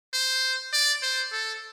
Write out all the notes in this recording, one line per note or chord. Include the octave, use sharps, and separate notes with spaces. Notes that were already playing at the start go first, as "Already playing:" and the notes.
C5
D5
C5
A4